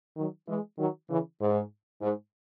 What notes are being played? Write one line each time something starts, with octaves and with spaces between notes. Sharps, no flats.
D#3 F#3
E3 G#3
D#3 F#3
C#3 E3
G#2
G#2